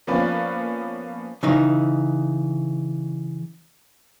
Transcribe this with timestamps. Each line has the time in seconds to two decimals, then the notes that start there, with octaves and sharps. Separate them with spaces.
0.07 F3 A#3 B3 C#4 B4 D5
1.43 C#3 E3 D#4